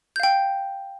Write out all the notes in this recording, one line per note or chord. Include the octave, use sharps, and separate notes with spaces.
F5 G5 G6